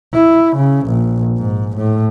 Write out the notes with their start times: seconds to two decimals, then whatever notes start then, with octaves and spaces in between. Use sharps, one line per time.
0.13 E4
0.57 C#3
0.87 A#1
1.38 G#2
1.77 A2